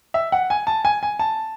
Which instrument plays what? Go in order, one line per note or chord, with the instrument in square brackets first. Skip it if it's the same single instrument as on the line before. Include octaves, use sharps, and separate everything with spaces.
[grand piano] E5
F#5
G#5
A5
G#5
G#5
A5